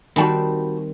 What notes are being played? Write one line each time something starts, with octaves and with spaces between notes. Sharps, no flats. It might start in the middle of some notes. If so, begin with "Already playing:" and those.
D#3 G3 C4 F#4 A5 B5